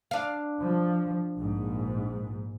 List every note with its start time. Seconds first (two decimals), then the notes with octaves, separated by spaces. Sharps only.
0.11 D4 F5
0.61 F3
1.38 A#1 G#2